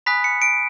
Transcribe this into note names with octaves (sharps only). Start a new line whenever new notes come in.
G#5 B5 D#6 F#6 B6
C#7
D7